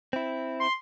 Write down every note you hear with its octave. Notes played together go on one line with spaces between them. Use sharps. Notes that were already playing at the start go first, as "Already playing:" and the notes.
C4 E4
C6